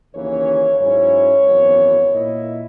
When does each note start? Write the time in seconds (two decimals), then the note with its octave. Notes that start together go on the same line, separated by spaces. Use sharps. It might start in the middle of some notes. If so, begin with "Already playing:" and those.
0.14 D#2 C#3 E3 A#3 C#4 C#5
0.80 G#2 F#3 C#4 E4 C#5
1.45 G#1 F#2 E3 B3
2.11 A#2 A#3 E4 D#5